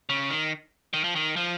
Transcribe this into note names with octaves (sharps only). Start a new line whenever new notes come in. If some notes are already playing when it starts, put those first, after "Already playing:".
C#3
D#3
D#3
F3
D#3
F3